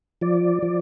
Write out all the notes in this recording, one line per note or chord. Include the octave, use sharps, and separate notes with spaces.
F3 D5
F3